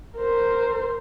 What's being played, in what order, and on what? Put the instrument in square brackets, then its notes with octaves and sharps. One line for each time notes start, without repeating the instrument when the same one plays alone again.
[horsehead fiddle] A#4 C5